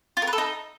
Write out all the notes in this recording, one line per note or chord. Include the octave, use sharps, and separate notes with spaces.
F4
A#4
B4
A4
D#4